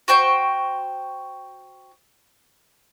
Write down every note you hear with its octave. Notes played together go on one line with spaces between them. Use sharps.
F#4 C5 G5 C#6